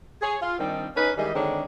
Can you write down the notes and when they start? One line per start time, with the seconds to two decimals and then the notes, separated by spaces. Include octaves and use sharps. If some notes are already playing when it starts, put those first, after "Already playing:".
0.22 G#4 C#5
0.42 F4
0.59 D#3 G3 C4 D4 D#4
0.96 C#4 D#4 B4
1.18 D#3 E3 G3 G#3 D#5
1.35 D3 D#3 G#3 C4 D4 C#5